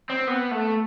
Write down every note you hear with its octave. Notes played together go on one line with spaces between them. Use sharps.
C4
B3
A3